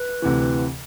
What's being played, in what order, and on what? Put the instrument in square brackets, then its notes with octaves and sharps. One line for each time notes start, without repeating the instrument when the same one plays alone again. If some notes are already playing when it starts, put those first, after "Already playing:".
Already playing: [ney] B4
[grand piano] D2 C3 E3